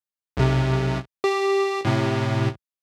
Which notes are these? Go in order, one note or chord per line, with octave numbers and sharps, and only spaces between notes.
B1 C3
G4
A2 C3